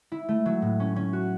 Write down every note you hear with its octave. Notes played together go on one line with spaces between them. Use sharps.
E4
A3
F#3
A2
C#4
C#4
F#4